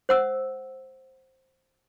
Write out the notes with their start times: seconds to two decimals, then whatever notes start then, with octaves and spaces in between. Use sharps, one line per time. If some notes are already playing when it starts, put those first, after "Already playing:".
0.09 C5 F#5 E6